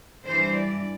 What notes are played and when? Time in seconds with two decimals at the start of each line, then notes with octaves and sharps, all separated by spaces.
0.24 G2 E3 G3 C5
0.55 D5